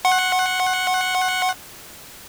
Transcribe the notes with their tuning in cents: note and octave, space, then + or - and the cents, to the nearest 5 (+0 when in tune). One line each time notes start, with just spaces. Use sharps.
F#5 +0 C6 +45